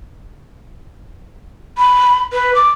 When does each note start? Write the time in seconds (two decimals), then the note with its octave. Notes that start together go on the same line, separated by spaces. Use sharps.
1.78 B5
2.33 B4
2.55 D6